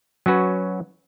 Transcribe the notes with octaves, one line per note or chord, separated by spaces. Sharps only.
F#3 C#4 F#4 B4